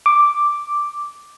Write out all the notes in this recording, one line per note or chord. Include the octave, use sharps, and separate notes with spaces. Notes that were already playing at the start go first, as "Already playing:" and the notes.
D6